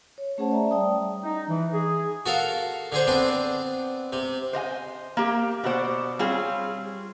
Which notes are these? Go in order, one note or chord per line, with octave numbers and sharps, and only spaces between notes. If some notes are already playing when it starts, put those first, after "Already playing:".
C#5
A3 C#4 G#4 C5 F#5 A5
D5 E5 A#5
G3 D5 G5 A5 D#6
D#4
E3
G#4
F#4 A4 A#4 F5
D3 G#4 C5
B3 C4 D4
C3
C5 D#5 F5 G#5
A#3 G4
B2 F#4 C5 D5
G3 C4 F4 G#4 C#5